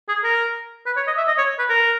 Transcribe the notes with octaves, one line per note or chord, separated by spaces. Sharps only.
G#4
A#4
B4
C#5
D#5
E5
D#5
C#5
B4
A#4